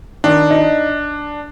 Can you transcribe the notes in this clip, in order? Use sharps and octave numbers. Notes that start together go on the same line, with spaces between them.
D#3 D4
D#4